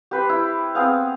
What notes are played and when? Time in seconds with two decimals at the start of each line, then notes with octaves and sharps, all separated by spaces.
0.11 G4 B4 C5
0.29 E4
0.75 B3 C4 G#4 F5